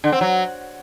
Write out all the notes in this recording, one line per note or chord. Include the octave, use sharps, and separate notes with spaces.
D3
C4
F#3